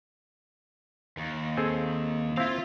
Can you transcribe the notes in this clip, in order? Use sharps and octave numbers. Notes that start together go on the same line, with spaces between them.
D#2
C4 G#4 A4
C4 E4 F4 F5